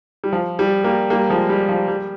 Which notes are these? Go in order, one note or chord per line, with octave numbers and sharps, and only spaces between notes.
G3
F3
G3
G3 A#3
G3 A#3
F3 G#3
G3
F3
G3